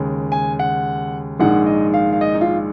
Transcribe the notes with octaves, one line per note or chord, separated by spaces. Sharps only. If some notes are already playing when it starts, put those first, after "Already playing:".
Already playing: D#2 C#3 G#3
G#5
F#5
A#1 G#2 D#3 G#3 F#5
D#5
F5
F5
D#5
D#4
F4